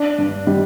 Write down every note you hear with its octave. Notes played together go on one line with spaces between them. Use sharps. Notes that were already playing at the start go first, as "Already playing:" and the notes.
Already playing: D4
G2
G3